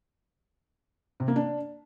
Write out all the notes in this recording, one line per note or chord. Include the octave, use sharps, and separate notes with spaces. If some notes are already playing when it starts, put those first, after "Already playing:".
C3
A#3
D4